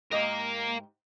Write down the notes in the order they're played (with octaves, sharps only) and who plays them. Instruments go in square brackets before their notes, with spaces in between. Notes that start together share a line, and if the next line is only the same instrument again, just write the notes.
[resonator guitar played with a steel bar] G#2 G4 D#5 [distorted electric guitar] A#4 F5